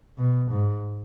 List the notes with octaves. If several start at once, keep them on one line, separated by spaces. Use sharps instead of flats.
B2
G#2